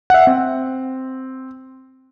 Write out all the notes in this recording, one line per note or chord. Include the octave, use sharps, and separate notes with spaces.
E5 F#5
C4